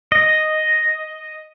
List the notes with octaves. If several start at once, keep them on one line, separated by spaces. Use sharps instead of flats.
D#5